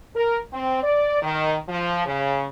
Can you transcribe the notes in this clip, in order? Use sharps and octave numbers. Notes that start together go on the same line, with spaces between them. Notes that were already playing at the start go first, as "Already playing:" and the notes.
A#4
C4
D5
D#3
F3
C#3